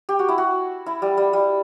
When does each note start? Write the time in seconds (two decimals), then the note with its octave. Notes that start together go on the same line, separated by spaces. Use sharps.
0.09 G4
0.19 F#4
0.29 E4
0.38 F#4
0.86 E4
1.02 G3
1.17 G3
1.33 G3